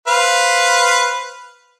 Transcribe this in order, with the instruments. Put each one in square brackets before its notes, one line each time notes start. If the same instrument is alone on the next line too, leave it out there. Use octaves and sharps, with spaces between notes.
[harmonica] B4 C5 F5